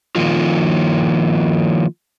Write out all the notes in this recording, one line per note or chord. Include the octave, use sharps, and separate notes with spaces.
D#3 F3 A#3 D#4 F4